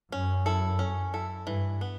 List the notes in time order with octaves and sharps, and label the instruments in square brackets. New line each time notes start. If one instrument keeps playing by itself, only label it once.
[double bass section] F#2 [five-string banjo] C#4
[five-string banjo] E4 A4
C#4
E4 A4
[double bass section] G2 [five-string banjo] E3
[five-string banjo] B3